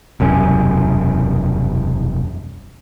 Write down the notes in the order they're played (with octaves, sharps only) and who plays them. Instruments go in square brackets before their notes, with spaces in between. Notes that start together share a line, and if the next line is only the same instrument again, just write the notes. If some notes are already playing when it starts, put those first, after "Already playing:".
[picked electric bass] E1 C2 F#2 C#4